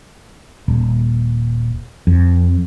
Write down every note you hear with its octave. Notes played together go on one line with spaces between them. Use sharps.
D#1
F2